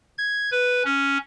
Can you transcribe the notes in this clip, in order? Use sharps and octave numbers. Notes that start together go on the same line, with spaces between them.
G#6
B4
C#4